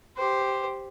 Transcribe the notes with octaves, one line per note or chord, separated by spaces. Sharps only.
G4 C5